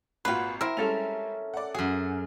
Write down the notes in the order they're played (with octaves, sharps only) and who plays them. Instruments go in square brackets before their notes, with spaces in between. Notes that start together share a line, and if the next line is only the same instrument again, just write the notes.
[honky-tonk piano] G#1 A#2 F#4 [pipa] F4 B4
[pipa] C4 E4 [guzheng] A#4 [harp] E5
[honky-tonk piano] G3 G#3 F7 [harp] C#4 A4 E5
[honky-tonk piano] D5 F#5
[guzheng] F#2 G#4 [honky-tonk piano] F#4